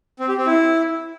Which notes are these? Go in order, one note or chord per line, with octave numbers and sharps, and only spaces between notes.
C4
G4
C4
E4